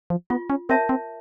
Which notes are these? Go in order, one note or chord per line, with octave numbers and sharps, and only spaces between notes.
F3
B3 F4
C#4
C4 A#4 C#5 E5 A5
C4